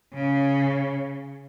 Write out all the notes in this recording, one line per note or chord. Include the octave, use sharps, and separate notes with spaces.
C#3